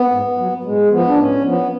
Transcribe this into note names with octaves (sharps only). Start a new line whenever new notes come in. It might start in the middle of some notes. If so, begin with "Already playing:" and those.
Already playing: B3
G#2
F#3
A2 G#3
F3 B3
D4
A2 C#4
F3 B3